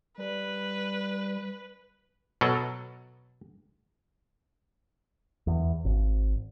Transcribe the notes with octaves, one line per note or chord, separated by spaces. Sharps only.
G3 B4
B2 F#3 A4
E2
G#1